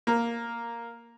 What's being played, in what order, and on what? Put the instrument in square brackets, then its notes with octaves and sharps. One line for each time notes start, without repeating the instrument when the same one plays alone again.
[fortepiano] A#3